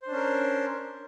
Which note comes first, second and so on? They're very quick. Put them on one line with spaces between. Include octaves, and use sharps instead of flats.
C5 D4 C#4 A#4